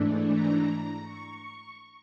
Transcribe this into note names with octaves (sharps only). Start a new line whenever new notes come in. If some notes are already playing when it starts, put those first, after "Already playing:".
Already playing: G#2 E3 A3 D4
A#5
C#6